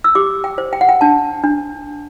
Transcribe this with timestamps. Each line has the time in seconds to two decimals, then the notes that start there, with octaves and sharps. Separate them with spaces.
0.04 E6
0.15 G4 D6
0.44 G5
0.58 C5
0.73 G5
0.81 F#5
0.89 G5
1.01 D4 A5
1.44 D4